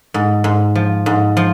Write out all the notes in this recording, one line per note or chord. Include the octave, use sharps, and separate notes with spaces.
G#2
G#2
F3
G#2
F3